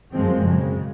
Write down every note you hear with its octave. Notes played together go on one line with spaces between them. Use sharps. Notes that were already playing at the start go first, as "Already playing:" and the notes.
F#2 F3 G#3 C4
F#2 C#3 G#3